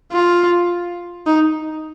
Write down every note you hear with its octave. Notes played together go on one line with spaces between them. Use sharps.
F4
D#4